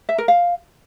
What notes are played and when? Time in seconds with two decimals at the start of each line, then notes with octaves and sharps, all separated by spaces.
0.09 E5
0.18 A#4
0.28 F5